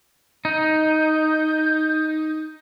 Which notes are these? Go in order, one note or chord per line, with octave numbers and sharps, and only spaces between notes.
D#4 G6